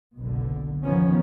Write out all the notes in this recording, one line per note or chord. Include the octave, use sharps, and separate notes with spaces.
F#1 B1 B2 D3
F#1 D#3 F3 B3 C#4